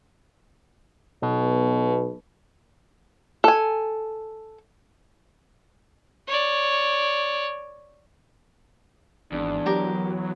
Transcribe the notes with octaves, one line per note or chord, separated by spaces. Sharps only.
B1 B2
A4 G#5
C#5 D5
G#1 E2 D4
F#3 G4 A#4 D6